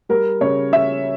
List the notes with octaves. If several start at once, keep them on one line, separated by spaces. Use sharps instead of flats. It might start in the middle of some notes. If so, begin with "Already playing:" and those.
G3 A#4
C#3 C#5
C#4 E5